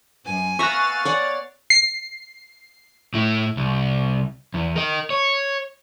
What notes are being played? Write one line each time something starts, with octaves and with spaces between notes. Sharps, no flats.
F#2 G#5
B3 E5 F5 A#5 C#6 F#6 A6
C#5 D5 F#5
C7
A2 E4
C2
E2
A#4 D#5
C#5